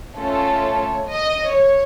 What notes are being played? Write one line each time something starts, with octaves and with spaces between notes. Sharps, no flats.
A3 C#4 F4 A4 C#5
D#5
C#5